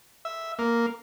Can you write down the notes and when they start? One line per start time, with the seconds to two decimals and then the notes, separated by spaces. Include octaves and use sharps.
0.25 E5
0.59 A#3